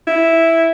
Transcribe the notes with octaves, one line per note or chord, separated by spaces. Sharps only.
E4